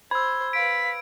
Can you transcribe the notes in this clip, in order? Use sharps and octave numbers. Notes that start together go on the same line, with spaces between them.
C5 B5 E6 G#6
B4 F5 B6 D7